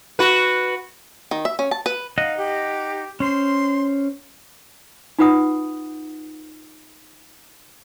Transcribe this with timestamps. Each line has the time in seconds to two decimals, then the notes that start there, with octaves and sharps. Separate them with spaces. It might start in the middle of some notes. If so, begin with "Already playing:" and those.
0.19 F#4 B4
1.31 D#3
1.45 E5
1.59 C#4
1.71 A5
1.86 B4
2.18 D#4 D#5 F5 F#5
2.37 G4
3.20 C#4 C5 C6
5.19 D#4 F4 B4 F#5 D#6